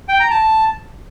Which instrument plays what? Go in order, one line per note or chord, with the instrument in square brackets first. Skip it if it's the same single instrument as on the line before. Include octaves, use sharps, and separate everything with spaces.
[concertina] G5
A#5
A5